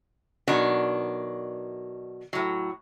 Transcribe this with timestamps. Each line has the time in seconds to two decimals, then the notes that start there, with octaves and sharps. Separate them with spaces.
0.47 B2 D#3 F#3 D4
2.33 A2 F#3